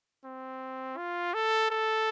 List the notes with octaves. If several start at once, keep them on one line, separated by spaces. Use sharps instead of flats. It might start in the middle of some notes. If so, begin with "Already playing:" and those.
C4
F4
A4
A4